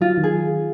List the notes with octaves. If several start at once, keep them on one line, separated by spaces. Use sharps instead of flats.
F#3 F4
D#3
G#4